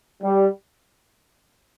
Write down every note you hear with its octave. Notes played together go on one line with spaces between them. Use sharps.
G3